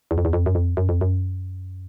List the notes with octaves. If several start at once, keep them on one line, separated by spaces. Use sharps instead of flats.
E2
F2
E2
F2
F#2
F2
F#2
F2
F#2